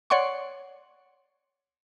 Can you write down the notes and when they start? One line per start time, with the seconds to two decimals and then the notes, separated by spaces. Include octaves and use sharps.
0.10 C#5 D5 F#5 C6 C#6